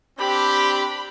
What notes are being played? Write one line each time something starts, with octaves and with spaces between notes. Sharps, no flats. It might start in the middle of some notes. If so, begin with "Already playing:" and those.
C4 D4 G4 B5